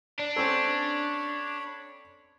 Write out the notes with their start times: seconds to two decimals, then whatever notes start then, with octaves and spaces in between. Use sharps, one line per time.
0.19 D4
0.36 C4 C#4 A4 C#5 B5